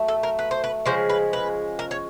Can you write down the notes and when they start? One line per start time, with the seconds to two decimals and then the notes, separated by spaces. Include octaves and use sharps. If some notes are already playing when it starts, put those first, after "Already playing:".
Already playing: F#3 A3
0.08 A4
0.23 A#4
0.39 B4
0.51 C5
0.64 B4
0.86 C#3 F3 G#3 C5
1.10 B4
1.33 B4
1.79 A#4
1.91 C#5